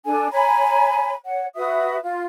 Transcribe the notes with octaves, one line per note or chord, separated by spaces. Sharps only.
D4 A4 G#5
C#5 G#5 A#5 B5
C#5 F#5
F#4 B4 E5 D#6
F4